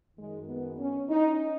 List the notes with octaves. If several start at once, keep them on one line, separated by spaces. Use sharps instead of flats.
F#2 D#3 G#3
B3
C#4
D#4